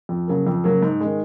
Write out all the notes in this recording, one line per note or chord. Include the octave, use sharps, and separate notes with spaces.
F2
C#3 F#3 A#3
F2
C#3 F#3 A#3
G#2
D#3 G#3